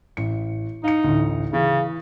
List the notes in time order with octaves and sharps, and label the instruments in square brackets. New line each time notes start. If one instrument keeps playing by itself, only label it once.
[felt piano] A1 C#7
[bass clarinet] D#4 [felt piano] F5 C#7
[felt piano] A1 D2
[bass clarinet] C#3 [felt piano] E3